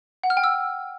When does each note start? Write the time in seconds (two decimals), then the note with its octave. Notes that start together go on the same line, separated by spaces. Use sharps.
0.24 F#5
0.30 F6
0.37 G5
0.44 E6